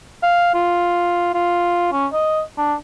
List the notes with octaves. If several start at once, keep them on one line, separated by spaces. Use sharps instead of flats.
F5
F4
F4
C#4
D#5
D4